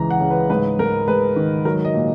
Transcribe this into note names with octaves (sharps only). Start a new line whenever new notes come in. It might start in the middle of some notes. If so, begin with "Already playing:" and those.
Already playing: C#2 E3 G#3 A#5
F#5
C#3
B4
G#2 B4
G#2 A#4
G#3 B4
D#3
F#3 A#4
D#5
A#2